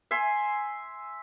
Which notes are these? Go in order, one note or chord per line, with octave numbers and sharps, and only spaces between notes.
E5 G#5 C6